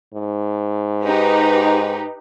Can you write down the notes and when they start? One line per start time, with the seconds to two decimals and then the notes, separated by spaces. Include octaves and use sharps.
0.14 G#2
1.05 D#4 G4 B4